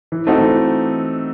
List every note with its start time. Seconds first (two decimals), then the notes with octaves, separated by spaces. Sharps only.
0.12 E3
0.27 A3 C4 D#4 F#4
0.41 E3